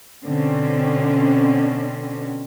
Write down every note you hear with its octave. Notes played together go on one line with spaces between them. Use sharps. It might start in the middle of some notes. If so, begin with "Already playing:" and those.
B2 D3 C4 C#4